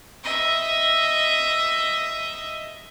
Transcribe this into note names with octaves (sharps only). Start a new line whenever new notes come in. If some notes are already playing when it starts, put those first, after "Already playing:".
D#5 E5